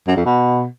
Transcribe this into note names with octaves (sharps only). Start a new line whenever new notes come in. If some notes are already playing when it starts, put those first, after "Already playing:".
F#2
F2
B2